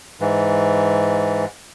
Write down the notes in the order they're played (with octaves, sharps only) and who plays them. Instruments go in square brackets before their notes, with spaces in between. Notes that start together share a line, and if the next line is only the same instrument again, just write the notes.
[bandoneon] G#2 E3